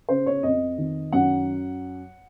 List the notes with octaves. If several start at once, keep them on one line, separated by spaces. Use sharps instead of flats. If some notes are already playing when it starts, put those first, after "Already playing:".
C#3 C5
C#5
F2 D#5
D#3
F#2 F#5